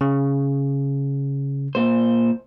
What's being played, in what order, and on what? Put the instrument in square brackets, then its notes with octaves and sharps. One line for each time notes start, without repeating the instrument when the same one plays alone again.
[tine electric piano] C#3
[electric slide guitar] A#2 C5